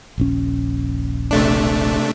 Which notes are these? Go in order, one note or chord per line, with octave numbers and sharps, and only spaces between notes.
D#1 A#1 C#4
C3 A3 D4